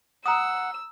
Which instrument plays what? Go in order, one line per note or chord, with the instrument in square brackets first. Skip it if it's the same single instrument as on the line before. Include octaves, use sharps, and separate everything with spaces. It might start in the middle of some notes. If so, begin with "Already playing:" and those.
[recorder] F#5 [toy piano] A#5 D#6 [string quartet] E6